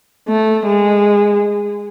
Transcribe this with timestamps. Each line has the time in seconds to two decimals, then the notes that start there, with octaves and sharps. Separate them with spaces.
0.29 A3
0.67 G#3